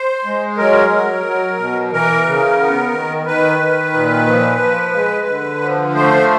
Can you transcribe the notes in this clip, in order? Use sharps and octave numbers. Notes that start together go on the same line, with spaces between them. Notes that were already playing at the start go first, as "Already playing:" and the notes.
Already playing: C5
G#3
F#3 A#4
F#3
F#3
B2
E3 A#4
C#3
B3
D#3
D#3 B4
D#3
A#2
F3
F3
G#3
D3
F3
A3 C5